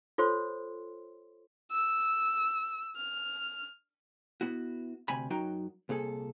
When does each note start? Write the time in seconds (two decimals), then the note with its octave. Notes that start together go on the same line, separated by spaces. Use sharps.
0.18 F4 A4 C5 C#5 C6
1.71 E6
2.97 F6
4.41 B3 E4 F#4
5.08 D2 C3 G#5 B5
5.30 F#2 F#3 D#4 F#4 G5 A#5
5.89 C2 A#2 G#4 A4